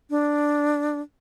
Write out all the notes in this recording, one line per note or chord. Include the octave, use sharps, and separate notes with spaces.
D4